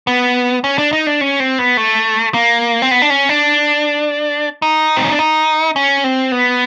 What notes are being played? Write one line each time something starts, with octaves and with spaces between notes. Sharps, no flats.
B3
C#4
D4
D#4
D4
C#4
C4
B3
A3
A#3
C4
B3
D4
C#4
D4
D#4
C4
C#4
D4
D#4
C#4
C4
B3